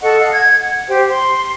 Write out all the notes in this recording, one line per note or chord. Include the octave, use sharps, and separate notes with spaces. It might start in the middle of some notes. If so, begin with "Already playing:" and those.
A4 D#5 F#5 C#6
D#5 F5 F#5
G#6
F#5
G4 C5 G5
C6